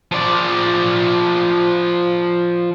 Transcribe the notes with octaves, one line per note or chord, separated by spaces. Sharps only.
F3 D5